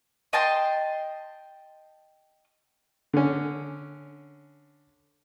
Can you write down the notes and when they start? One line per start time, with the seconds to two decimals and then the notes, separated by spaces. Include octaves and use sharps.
0.33 D#5 G5 A5 C6
3.14 D3 C#4